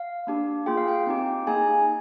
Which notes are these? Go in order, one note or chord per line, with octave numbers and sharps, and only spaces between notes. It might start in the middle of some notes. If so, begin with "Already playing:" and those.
Already playing: F5
A#3 D4 G4
A#3 F4 G#4 G5
F5
G5
C4 D#4 G4
A#3 D#4 G#4 G#5